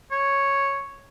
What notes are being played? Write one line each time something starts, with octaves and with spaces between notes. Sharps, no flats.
C#5